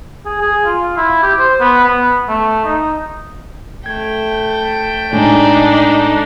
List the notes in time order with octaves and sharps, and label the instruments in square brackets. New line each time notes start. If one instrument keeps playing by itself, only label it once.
[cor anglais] G#4
G#4
F4
E4
G4
C5
B3
B3
A3
D#4
[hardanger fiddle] A3 G5 [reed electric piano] G#6
[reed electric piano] A2 G#3 G#5 [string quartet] D4 D#4